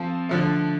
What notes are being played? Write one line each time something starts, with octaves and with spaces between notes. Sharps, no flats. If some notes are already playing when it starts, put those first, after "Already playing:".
Already playing: F3 C4 F4 A4
D3 F3 A3